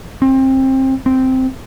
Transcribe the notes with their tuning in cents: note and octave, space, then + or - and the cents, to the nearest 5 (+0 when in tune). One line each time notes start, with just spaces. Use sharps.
C4 +25
C4 -5